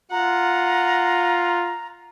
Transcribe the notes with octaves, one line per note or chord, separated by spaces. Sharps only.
F4 F#5 A#5